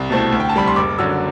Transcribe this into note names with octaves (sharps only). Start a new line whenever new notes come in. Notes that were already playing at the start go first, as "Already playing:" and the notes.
Already playing: C2
B2 A3 C4 E4
D2
G5
A5
C3 G3 B5
C6
F#1 D6
F#2 D3 F#3 E6